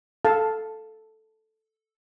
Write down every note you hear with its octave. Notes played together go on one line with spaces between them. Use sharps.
A4 F5 A5